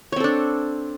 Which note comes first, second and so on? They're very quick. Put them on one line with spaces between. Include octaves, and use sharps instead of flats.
C#5 C4 A4 D4